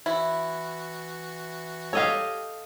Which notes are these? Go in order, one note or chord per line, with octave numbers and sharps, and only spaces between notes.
E3 E4 F#4
G4 A4 C#5 D#5 F5